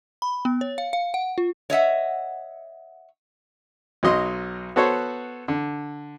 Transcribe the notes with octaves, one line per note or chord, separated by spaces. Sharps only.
B5
B3
C#5
F5
F5
F#5
F4
C#5 D#5 E5 F#5
B1 F#3 D#5 C6
B3 F#4 A4 C5 C#5
D3